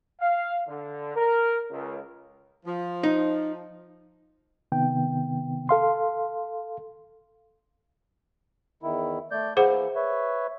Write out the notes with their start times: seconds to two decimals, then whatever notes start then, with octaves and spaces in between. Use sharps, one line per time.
0.21 F5
0.67 D3
1.16 A#4
1.71 C#2
2.66 F3
3.03 D#4
4.72 C3 D#3 B3 G5
5.69 A4 F5 C6
8.83 E2 D#3 E4
9.31 A3 D5 G6
9.57 E3 A#3 E4 G#4 C5 F#5
9.95 B4 C#5 E5